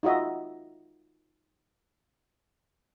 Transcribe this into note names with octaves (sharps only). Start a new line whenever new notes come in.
D#4 F4 F#4 D#5 E5